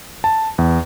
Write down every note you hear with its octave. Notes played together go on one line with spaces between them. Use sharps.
A5
E2